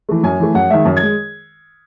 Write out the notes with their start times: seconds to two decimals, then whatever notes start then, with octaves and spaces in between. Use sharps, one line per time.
0.09 E3 A3
0.23 F#2 G#5
0.40 E3 A3
0.54 F#2 F#5
0.70 D#3 G#3 E5
0.85 F#2
0.97 G#6
1.02 G#3